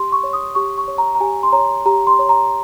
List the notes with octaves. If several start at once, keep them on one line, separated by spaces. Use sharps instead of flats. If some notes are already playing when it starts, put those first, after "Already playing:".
Already playing: G4 C6
C#6
C#5
D#6
G4 C#6
C#6
C#5
A#5
A#5
G4 G#5
C6
C#5 A#5
G4 A#5
C6
C#5
A#5